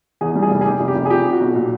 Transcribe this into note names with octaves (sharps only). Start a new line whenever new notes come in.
E2 G#4
G3
G#4
F1
G#4
F1 G4
F1
G4
F1
G#4
F3 G4
F3
F#4
B1
A#2